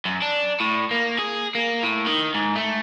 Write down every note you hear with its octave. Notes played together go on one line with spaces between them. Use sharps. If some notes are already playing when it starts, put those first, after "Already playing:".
F#2
D4
A2
A#3
G#4
A#3
A2
D#3
G#2
A3